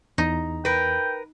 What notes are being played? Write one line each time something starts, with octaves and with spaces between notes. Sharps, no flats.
E2 D#4 A#5
A#4 B4 G5